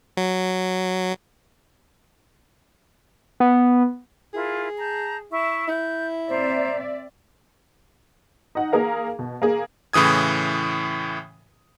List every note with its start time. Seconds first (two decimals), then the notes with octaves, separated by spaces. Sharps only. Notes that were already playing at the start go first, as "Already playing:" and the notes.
0.17 F#3
3.40 B3
4.34 E4 F4 G#4 A#4
4.79 A5 A#5 G6
5.31 E4 E5 C#6
5.68 E4 G6
6.29 C4 C5 D5 E5 A#5
8.55 D#4 F#5
8.73 A#3 G#4 A#4 F5
9.19 B2
9.42 A#3 G#4
9.93 A2 C#3 E3 D#6 G#6